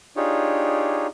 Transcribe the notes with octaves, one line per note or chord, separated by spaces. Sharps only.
D4 D#4 F4 G4 G#4 C#5